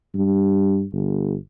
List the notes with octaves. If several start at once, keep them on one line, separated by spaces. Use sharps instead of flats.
G2
G1